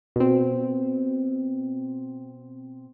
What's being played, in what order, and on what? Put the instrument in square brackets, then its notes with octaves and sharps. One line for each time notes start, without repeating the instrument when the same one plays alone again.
[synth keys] B2 C4